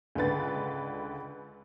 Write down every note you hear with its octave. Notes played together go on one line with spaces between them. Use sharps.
C#2 D3 B4 A6